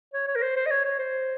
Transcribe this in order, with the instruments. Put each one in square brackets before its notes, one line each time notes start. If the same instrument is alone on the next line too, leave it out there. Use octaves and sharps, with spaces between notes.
[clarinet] C#5
C#5
A#4
C5
C5
D#5
C#5
C#5
C5